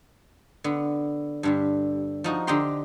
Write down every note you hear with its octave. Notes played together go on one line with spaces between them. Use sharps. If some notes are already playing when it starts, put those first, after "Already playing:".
D3 B3
G2 D3 G3
F3 D#4 F#4
D3 G4 D#5 G5 A#5 C6